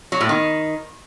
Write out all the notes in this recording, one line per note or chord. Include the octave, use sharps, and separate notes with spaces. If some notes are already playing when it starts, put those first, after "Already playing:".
F#3
A2
D#3